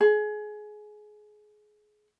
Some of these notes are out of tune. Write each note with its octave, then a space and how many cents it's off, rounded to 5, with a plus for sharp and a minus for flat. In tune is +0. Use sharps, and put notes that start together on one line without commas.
G#4 +25